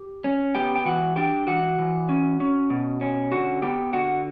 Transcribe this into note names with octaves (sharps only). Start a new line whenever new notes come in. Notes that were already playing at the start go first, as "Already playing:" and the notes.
Already playing: G4
C#4
B3 G4 G5
G5
E3 F#4 F#5
D4 G4 G5
E3 F#4 F#5
E3
C#4
C#4
B2
C#4
D3 F#4 F#5
B3 G4 G5
D3 F#4 F#5